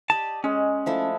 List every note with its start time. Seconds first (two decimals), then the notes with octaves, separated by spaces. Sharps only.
0.10 G4 D5 D#5 A5
0.44 G#3 C#4
0.86 F3 A3 E4